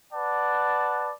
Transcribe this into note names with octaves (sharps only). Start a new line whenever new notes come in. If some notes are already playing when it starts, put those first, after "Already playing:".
B4 D5 F#5 A5